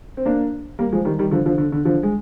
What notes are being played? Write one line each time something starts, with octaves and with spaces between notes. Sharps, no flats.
C4
A#3 D4
G3 A#3
F3 G#3
D#3 G3
D#3 G3
D3 F3
D3 F3
D3
D3
D3 F3
G#3